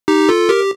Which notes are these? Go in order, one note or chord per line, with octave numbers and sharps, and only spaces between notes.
D#4 G4
F4 A4
G4 A#4